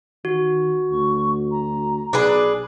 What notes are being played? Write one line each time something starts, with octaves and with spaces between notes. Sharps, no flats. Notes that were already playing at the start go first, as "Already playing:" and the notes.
D#3 F#4
D2 C#6
A#5
B1 D4 G#4 B4